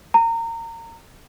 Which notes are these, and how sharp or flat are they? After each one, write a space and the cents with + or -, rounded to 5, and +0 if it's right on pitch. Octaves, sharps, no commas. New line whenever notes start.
A#5 -25